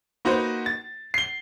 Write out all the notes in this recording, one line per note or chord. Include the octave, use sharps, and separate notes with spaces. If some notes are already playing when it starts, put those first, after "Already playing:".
A#3 D#4 F#4 B4 C5
A6
C7 G7